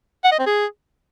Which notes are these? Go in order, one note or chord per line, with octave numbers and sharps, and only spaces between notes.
F#5
D#5
C4
G#4